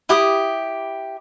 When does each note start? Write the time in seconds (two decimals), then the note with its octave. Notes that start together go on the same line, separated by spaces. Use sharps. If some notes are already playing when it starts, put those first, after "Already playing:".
0.09 E4 G4 D6 D#6